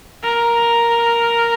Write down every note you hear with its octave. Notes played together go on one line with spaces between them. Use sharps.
A#4